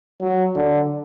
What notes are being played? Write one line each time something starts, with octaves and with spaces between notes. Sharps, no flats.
F#3
D3